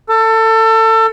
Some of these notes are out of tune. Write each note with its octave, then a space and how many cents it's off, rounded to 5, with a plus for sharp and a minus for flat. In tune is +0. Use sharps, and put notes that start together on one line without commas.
A4 +25